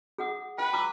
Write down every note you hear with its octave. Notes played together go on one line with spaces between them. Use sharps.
G#4 F#5 D#6
B4 G5
A#5 D6 E6